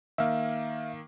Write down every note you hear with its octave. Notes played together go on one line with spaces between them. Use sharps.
D#3 A#3 E5 F5